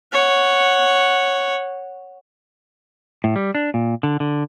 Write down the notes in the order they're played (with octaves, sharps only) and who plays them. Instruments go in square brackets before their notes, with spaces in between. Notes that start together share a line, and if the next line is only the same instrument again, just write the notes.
[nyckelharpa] C#5 F#5
[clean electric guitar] A2
G3
D4
A#2
D3
D3